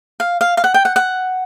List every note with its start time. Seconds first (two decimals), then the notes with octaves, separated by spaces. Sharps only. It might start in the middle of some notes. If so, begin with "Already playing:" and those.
0.20 F5
0.41 F5
0.57 F5
0.64 F#5
0.74 G5
0.85 F#5
0.96 F#5